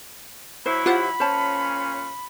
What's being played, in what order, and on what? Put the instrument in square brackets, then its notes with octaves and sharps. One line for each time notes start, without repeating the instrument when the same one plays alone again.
[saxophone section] F#3 E4 [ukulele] C5 [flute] B5
[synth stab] F4 F#5 [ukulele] G4 C5
[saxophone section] A#2 C#4 [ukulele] C5 C#5 A5